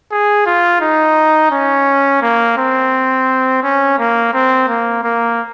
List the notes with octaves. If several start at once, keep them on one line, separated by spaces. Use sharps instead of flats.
G#4
F4
D#4
C#4
A#3
C4
C#4
A#3
C4
A#3
A#3